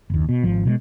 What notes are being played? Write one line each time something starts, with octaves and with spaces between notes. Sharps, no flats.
F#1 D#2
B2
G#1 F3
B2 D#3 G#3